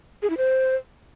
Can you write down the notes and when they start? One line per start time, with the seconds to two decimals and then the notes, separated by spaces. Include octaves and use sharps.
0.22 G#4
0.30 E4
0.37 C5